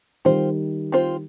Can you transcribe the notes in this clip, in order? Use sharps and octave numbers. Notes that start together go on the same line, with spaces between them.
D#3 G3 C4 F4 C5
C4 F4 C5